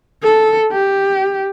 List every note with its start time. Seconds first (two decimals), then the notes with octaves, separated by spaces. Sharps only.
0.23 A4
0.72 G4